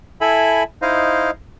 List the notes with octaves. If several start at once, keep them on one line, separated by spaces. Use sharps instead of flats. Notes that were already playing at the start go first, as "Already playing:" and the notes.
E4 A4 E5 G#5 B5
D#4 E4 C5 D#5 F5